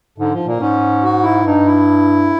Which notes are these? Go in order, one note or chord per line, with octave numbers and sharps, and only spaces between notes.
G#2 D3
F3
A#2 A#3
G#2 C#4
F#4
E4
G2 D#4
E4